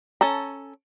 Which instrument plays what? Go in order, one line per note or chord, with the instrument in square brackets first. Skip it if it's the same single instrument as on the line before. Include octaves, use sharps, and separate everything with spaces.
[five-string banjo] C#4 A4 A5 A#5